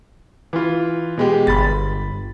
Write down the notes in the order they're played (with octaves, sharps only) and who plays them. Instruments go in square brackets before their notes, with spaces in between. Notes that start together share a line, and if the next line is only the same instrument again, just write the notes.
[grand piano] E3 F4
B2 G#3 G4
[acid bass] G1 [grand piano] B5 A6